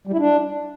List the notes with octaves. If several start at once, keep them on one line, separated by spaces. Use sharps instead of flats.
G3
E4
D4